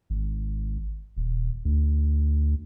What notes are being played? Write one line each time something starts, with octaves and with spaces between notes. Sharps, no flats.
G#1
D#1
D2